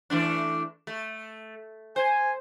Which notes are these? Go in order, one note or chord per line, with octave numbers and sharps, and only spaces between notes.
E3 A3 D4
A3
C5 G#5